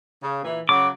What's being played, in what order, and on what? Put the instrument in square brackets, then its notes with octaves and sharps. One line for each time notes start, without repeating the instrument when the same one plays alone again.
[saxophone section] C#3
A#2 E3
[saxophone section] C#3 F#3 [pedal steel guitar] D6